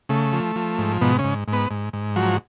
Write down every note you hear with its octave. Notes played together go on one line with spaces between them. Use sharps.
C#3 A3
F3
F3
G#2
G#2 B2 B3
C#3 C#4
G#2
G#2
B3 B4
G#2
G#2
F3 F#3 F#4